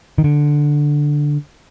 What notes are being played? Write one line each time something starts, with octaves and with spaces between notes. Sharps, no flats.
D#3
D3